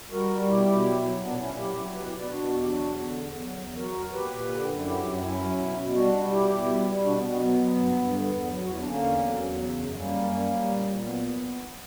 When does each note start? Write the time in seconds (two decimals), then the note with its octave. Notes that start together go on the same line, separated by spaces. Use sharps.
0.12 G3 F#4 A#4
0.30 G3
0.48 B2 E4 G4
0.66 B2
0.85 F#3
1.03 F#3
1.21 A#2 B3 D4
1.39 A#2 C#4 E4
1.57 F#3 E4 G4
1.76 F#3
1.94 B2 G4 B4
2.05 E4 G4
2.12 B2
2.18 B4 D5
2.30 B2 D4 F#4
2.48 E2
2.60 G4
2.66 F#3 D4 F#4
2.85 E2
3.04 D3
3.21 E2
3.39 F#3
3.58 E2
3.75 F#3 F#4 A#4
3.94 F#3
4.12 A#2 G4 B4
4.31 A#2
4.49 D3
4.67 F#2
4.85 F#3 E4 G4
5.04 F#2
5.22 F#3 C#4 E4
5.40 F#3
5.58 B2
5.77 B2
5.95 G3 D4 F#4
6.13 G3
6.31 B2 E4 G4
6.49 B2
6.67 G3
6.86 G3
7.04 B2 D4 F#4
7.16 B3
7.22 B2
7.28 B3
7.40 F#3 B3
7.58 F#3
7.76 G2
7.95 G2
8.13 D3
8.31 E2
8.50 F#3
8.64 F#4
8.68 E2 E4
8.79 D4
8.86 D3 A#3 C#4
9.05 E2
9.23 F#3
9.41 E2
9.59 C#3
9.77 F#2
9.95 G3 A#3 C#4
10.14 F#2
10.31 G3
10.50 G3
10.69 A#2
10.86 A#2
11.04 F#3 B3